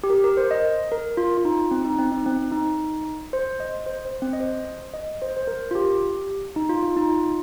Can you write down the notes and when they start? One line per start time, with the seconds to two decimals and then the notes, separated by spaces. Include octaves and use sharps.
0.04 G4
0.10 A#4
0.24 A#4
0.37 C5
0.51 D#5
0.92 A#4
1.17 F4
1.37 F4
1.45 D#4
1.71 C4
1.85 D#4
1.99 C4
2.12 D#4
2.26 C4
2.52 D#4
3.33 C5
3.60 D#5
3.86 C5
4.05 C5
4.22 C4
4.33 D#5
4.40 C5
4.94 D#5
5.22 C5
5.37 C5
5.47 A#4
5.71 F4
5.75 G4
6.56 D#4
6.69 F4
6.82 F4
6.96 D#4
7.09 F4